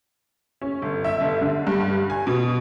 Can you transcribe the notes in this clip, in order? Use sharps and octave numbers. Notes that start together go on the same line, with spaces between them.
C#4
G1
E5
G1
D3
G2
G#5
B2